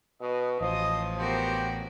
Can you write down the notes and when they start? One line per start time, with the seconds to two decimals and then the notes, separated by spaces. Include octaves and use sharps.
0.21 B2 F#4 D#5
0.61 A1 F3 C5 D#5 D#6
1.19 B3 F#4 G4 A#4 C5